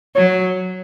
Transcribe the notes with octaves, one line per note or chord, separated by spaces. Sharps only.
F#3 C#5